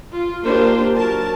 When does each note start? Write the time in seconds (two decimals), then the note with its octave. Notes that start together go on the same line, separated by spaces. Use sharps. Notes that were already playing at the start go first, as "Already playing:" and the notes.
0.13 F4
0.46 A#3 D4 F4 G4 A#4 C5
0.97 F#3 A#4 A5